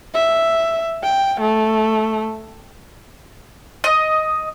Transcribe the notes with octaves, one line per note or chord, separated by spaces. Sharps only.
E5
G5
A3
D#5